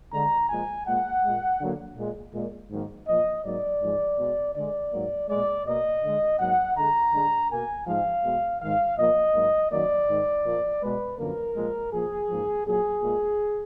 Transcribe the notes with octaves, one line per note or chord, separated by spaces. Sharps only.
D3 G#3 A#5
A#2 F3 G#3 G#5
A#2 G#3 F#5
A#2 G#3
D3 F#3 A#3
A#2 G#3
A#2 G#3
G#2 D#3 F#3 A#3
A#2 F3 A#3 D#5
G#2 F#3 A#3 D5
G#2 F3 G#3
B2 G#3
D3 G#3 D5
G#2 F#3 A#3
A#2 G#3 D5
B2 A#3 D#5
D3 G#3
G#2 F#3 A#3 F#5
D3 G#3 A#5
D3 G#3
B2 A#3 G#5
G#2 F3 G#3 F5
B2 G#3
G#2 D#3 G#3 F5
A#2 F3 A#3 D#5
G#2 F#3 A#3
F#2 D#3 F#3 A#3 D5
G#2 D#3 G#3
A#2 F3 A#3
B2 G#3 B4
F#2 D3 F3 A#3 A#4
A#2 F3 G#3
A#2 F3 A#3 G#4
G#2 F3 A#3
A#2 F#3 A#3 G#4
A#2 G#3